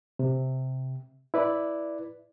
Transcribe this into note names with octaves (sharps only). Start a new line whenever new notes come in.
C3
E4 B4 D5